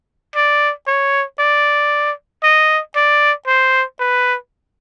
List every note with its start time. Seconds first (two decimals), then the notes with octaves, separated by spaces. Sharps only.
0.35 D5
0.87 C#5
1.39 D5
2.43 D#5
2.96 D5
3.47 C5
4.00 B4